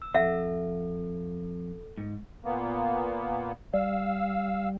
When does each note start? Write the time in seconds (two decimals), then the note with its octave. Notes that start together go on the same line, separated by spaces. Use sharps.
0.02 E6
0.14 F2 A4 E5 F#5
1.98 G#2
2.45 A#2 A#3 B3
3.74 G3 F5 E6